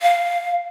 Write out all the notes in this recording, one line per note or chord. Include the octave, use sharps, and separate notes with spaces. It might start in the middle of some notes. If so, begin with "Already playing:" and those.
F5